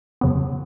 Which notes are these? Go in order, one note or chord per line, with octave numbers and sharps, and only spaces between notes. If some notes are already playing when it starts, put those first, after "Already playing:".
F2 C#3 F#3 B3